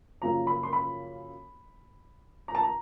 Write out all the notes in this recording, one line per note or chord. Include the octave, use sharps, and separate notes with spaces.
F#2 C#3 F3 A#3 A#5
B5
C6
B5
A#5
A5
A#5